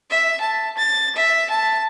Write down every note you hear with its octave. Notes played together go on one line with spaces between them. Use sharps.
E5
A5
A6
E5
A5